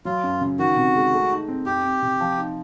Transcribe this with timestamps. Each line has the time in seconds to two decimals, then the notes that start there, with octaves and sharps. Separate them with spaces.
0.05 F#3 F4
0.24 F#2
0.41 C#3
0.59 D#3 F#4
0.77 C3
0.95 G#3
1.12 A3
1.31 D#4
1.48 C4
1.66 F2 G4
1.83 F2
2.02 C3
2.20 F3
2.38 D#4